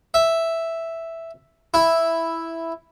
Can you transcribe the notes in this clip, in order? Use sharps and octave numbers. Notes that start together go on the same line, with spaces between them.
E5
E4